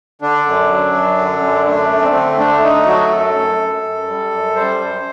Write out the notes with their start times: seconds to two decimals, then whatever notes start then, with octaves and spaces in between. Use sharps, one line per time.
0.22 D3 D4
0.45 F#2
0.71 F#3
0.94 F#2
1.18 D3
1.43 F#2
1.66 A3 D4
1.91 A3
2.02 C4
2.15 D3
2.38 A3 D4
2.62 A3 D#4
2.87 F#3 F#4
3.11 F#2 A4
3.36 F#2
3.59 F#2
3.83 F#2
4.07 G3
4.31 F#2
4.56 G3 C5
4.79 F#2